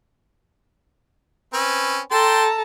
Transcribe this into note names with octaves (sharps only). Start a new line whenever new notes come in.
C4 C#4 B4
A4 G5 A5 A#5 C6